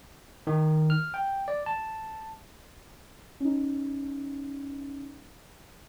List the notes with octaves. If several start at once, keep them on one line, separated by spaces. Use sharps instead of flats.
D#3
F6
G5
D5
A5
C#4 D#4